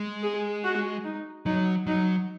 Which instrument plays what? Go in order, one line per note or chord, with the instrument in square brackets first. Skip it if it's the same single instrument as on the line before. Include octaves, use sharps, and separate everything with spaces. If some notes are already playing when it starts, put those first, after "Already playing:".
Already playing: [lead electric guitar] G#3
[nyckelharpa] G#4
F#4
D#4
[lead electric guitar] F#3 [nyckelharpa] D#4
[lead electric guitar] F#3 [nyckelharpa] D#4